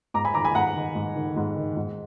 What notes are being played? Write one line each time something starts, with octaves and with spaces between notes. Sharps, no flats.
G#2 A#5 D6
G#5 B5
D#3 A#5 D6
G#5 B5
G#2 F#5 A#5
D#3
G#2
D#3
G#2
D#3
G#2